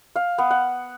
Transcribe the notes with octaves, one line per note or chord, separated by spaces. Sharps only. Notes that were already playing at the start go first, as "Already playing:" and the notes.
F5
B3
F#5